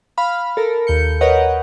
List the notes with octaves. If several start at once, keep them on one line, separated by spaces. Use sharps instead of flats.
F5 B5 F6
A4 A#4
D#2 G6 C#7
A#4 B4 C#5 D#5 F#5